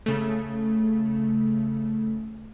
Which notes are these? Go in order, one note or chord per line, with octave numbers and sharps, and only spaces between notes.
C#3 A3